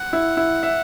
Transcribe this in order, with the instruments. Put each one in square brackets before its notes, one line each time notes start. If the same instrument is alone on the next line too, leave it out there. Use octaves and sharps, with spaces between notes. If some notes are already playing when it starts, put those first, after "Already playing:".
Already playing: [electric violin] F#5
[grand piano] E4
E4
E5